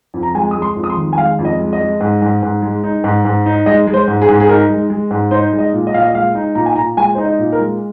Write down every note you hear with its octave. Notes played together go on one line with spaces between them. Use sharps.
F2
A#5
G#3 G#5
G#3 D#6
C6
F2
D#6
C6
D#3
G#5
G#3 F5
F2
D#5
G#3
D#5
G#3
G#2
G#2
G#2
G#3
D#4
G#2
G#2
D#4
G#3 D#5
G#3
C5
G#2
G#4
G#2
G#4
D#4 A#4
G#3
G#3
G#2
D#4 C5
G#3
D#5
A#2
D#5
A#2 F5
D#5
G#3 F5
D#4
A#2 A#5
G#5
A#2 A#5
G#3 G#5
D#4 C5
D#5
A#2
A#4
G#3